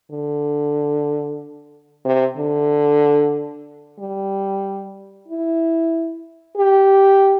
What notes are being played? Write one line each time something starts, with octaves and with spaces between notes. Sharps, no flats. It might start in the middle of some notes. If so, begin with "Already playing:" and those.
D3
C3
D3
G3
E4
G4